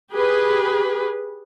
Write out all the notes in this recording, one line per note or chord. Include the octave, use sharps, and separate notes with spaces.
G4 G#4 B4